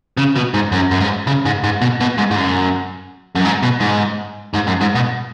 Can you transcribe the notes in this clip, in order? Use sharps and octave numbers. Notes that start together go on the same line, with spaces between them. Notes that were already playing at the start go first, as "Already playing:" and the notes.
C#3
B2
G#2
F#2
F#2
G#2
C#3
G#2
G#2
B2
B2
G#2
G#2
F#2
F#2
G#2
B2
G#2
G#2
F#2
G#2
B2